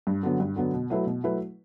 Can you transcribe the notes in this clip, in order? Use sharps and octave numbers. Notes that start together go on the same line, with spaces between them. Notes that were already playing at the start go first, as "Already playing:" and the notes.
G2
D3 F#3 B3
G2
D3 F#3 B3
B2
F#3 A3 E4 B4
B2
F#3 A3 E4 B4